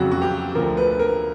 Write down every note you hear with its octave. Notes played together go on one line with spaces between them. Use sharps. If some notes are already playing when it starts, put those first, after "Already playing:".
Already playing: F2 C#3 F#3 F#4
F#4
G4
D2 D3 F3 A#4
B4
A#4